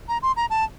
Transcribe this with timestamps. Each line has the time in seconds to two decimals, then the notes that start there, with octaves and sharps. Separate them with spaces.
0.08 A#5
0.22 C6
0.36 A#5
0.50 A5